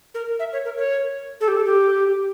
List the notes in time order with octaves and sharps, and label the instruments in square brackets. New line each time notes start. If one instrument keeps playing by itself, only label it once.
[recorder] A#4
E5
C#5
A#4
C#5
A4
G4
A4
G4